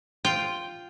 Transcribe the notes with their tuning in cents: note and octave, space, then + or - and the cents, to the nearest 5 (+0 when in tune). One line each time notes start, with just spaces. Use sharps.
F4 +0 G5 +0